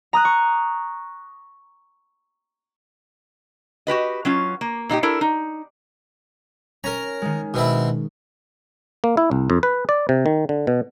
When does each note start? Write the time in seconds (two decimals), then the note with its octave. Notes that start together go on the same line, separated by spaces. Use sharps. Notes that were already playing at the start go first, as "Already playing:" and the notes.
0.13 A#5 D#6 F#6
0.25 C#6
3.87 F#4 G4 B4 D#5
4.25 F#3 C#4 F4
4.61 A#3
4.89 A#2 D#4 E4 G4
5.03 D4 E4 A4 A#4
5.21 D#4
6.84 C#4 A#4 A#5
7.22 D#3 G#3
7.54 B2 C4 E4
9.04 A#3
9.17 E4
9.31 C2
9.50 F2
9.63 B4
9.89 D5
10.09 C3
10.26 D#3
10.49 D3
10.67 B2